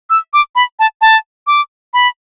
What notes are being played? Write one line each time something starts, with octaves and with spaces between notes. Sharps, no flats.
E6
D6
B5
A5
A5
D6
B5